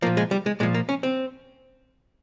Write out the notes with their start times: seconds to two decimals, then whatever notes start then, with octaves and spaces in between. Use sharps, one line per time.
0.02 F3 A#3
0.06 A#2
0.17 G#3
0.31 G3
0.46 G#3
0.60 A#2 G#3
0.63 F3
0.74 A#3
0.89 C#4
1.03 C4